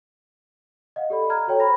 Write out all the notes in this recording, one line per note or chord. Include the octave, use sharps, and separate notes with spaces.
D#5 F5 F#5
G4 A4 D5 B5
A#5 F6 G#6
F#4 A4 C#5 G5
C5 B5 A#6